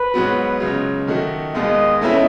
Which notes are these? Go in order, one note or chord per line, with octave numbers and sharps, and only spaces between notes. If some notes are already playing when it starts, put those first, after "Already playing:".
Already playing: B4
G#2 F#3 B3 F#4
C#2 C#3 F#3
D#3 A3 D#4 F#4
D#2 D#3 G#3 B3 D#5
B2 A3 C#4 E4 B4